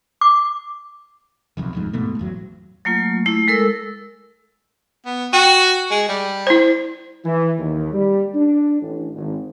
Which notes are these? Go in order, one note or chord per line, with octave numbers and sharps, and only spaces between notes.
D6
F#1 B1 F2
D#1 F2 G#2
D1 G#2 B2 A3
A1 E2 F#3
F#3 A3 A#3 F4
A3 E4
G#3 A4 A#4 E6
B3
F#4 G5
G#3
G3
E4 C5
E3
D#2
G3
D4
A1
G#1